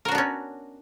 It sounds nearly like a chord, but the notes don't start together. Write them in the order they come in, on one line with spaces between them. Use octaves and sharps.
A#4 F#4 D4 B3 C#4